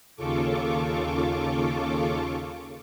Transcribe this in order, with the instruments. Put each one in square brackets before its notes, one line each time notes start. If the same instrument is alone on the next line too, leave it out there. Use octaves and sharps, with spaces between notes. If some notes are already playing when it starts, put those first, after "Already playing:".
[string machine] D#2 C#3 F4 A4 C#6 D6